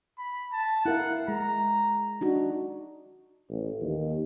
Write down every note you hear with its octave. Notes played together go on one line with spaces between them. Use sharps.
B5
A5
E4 A#4 F5 F#5
G#3 A#5
D4 D#4 F#4
A1
D#2